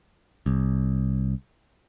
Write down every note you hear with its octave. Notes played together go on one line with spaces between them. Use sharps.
C2